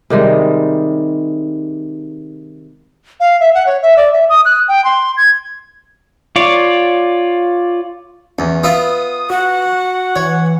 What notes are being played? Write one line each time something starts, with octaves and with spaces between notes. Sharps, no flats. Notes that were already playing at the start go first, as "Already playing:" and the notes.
C3 D#3 G3 G#3
F5
E5
F#5
C#5
E5
D5
E5
D#6
F#6
G5
C6
G#6
F4 C#5 D5
E2 C#4
B3 F4 E5 D#6
F#4 F#5
E3 C#5